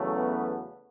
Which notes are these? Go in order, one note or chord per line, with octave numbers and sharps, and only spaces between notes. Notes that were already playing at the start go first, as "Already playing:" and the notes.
Already playing: E2 C#3 F#3 A3
B3